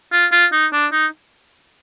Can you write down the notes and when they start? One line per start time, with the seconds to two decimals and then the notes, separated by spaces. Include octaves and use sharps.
0.12 F4
0.32 F4
0.52 D#4
0.73 D4
0.92 D#4